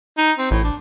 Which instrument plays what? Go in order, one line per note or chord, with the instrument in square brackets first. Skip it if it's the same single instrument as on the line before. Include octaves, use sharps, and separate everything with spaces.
[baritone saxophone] D#4
C4
[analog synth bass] A1 [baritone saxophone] A2
[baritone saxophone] D4